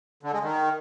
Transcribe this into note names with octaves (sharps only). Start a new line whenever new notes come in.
D3
G#3
D#3